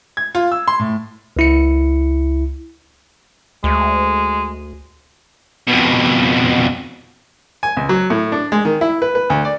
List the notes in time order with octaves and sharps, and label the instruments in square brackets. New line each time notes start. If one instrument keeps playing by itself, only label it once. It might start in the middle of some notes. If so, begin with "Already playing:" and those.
[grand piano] G#6
F4
E6
C6
A2
[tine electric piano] C#2 E4 C#7
[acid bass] D2 [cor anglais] G#3
[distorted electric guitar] F2 B2
[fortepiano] G#5
C#2
F#3
A2
D4
G#3
D#3
E4
B4
B4
D2
D5